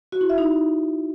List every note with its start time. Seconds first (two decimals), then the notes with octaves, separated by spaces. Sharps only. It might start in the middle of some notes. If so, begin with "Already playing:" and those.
0.12 F#4
0.21 E4
0.29 E5
0.38 D#4